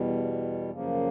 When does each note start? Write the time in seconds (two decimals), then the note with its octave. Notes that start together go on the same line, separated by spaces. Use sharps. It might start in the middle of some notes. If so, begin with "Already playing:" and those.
Already playing: E2 B2 G3
0.70 F#2 C#3 F3 A#3